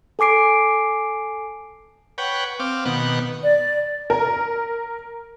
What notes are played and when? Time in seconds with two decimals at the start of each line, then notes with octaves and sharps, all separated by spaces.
0.19 A4 G#5 D6 C7 D7
2.18 B4 C#5 F#5 G5
2.60 C4 F5 D6
2.85 B2 D#3 B3 F#5
3.42 D5
4.10 A#4